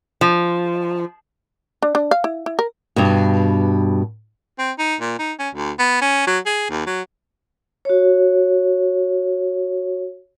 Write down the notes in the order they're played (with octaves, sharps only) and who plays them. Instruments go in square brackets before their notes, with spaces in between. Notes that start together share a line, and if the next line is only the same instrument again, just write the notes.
[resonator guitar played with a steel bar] F3
[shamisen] D4
D4
F5
E4
E4
A#4
[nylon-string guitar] G2 B2
[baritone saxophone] C4
D#4
A#2
D#4
C#4
D2
B3
C#4
F#3
G#4
D#2
F#3
[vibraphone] F#4 C#5